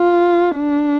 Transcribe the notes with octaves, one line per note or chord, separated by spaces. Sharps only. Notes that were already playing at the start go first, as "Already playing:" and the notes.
Already playing: F4
D4